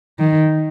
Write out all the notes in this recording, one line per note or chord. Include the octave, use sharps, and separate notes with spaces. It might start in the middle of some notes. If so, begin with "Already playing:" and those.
D#3